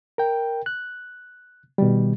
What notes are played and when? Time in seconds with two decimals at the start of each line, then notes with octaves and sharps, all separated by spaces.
0.18 A#4 G5
0.66 F#6
1.78 B2 D#3 G3